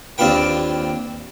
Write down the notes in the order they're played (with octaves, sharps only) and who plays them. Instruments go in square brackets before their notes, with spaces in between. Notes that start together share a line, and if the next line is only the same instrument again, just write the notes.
[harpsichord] D#2 C4 D4 F4 B4 G5